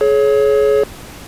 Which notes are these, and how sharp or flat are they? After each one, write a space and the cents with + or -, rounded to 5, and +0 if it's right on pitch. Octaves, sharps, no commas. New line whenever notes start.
G#4 +35 C#5 +0